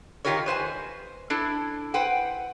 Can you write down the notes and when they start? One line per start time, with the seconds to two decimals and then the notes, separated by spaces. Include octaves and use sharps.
0.25 D#3 E3 F4 G4 A#4 C#5
0.46 B4 C5 E5 G#5
1.30 D4 E4 A4
1.94 B4 C5 F#5 G5